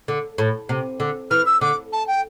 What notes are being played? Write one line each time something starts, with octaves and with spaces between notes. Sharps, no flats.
D3
A2
C3
D3
E3 F6
E6
D3 D6
A5
G5